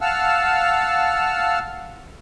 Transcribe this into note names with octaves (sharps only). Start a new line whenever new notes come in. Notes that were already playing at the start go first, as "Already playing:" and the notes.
F5 F#5 A5 E6 F6